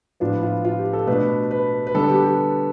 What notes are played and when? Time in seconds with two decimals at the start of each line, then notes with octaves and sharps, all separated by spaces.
0.20 A2 F3 B3 D4 F4
0.43 F4
0.65 F4
0.78 G4
0.93 A4
1.07 B2 A3 D4 B4
1.51 B4
1.87 B4
1.95 D3 G3 B3 D4 A4
2.09 G4
2.24 G4